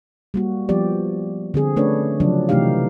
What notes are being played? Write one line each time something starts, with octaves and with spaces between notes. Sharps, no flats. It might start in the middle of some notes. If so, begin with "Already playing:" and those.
G3 A#3 F#4
F3 G3 B3 G4 D5
D3 C4 G#4
A3 C#4 D4 B4 C#5
C#3 F3 F#3 D4
C3 E3 A3 D#4 G4 F5